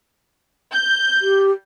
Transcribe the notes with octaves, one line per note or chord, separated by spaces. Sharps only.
G6
G4